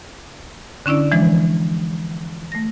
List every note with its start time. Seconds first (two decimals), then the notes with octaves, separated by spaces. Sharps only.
0.86 D3 C#4 D4 E4 D5
1.12 E3 F3 G#3 D4
2.52 A3 A#6